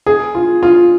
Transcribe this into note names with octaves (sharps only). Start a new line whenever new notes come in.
G#4
F4
F4